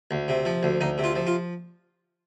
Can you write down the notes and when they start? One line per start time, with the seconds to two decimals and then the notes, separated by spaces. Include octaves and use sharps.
0.11 D2
0.28 C3
0.45 F3
0.63 D2
0.81 D2 D#4
0.98 C3
1.04 F4
1.15 F3
1.27 F4